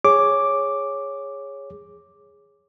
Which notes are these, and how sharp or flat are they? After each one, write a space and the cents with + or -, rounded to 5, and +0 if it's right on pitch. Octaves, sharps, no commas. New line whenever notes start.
G#4 -10 C#5 +0 D6 +0